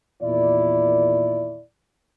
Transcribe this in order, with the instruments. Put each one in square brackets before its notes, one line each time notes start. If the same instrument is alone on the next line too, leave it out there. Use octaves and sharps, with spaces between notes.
[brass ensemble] E2 A#2 D#3 E4 D5